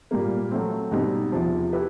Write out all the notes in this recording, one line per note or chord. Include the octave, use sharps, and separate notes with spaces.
A#2 G3 A#3
F#3 A3 C4
B2 G3 C4 D#4
E2 C3 F3
E4 G4 B4